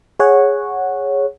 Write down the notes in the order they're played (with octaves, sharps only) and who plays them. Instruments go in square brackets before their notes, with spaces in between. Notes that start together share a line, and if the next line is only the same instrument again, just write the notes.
[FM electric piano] G#4 C#5 F#5